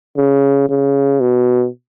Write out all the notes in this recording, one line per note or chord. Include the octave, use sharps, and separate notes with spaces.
C#3
C#3
B2